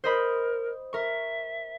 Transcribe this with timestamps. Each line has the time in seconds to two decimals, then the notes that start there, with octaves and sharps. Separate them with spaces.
0.04 A#4 C5 D#5 B5
0.93 A#4 E5 C#6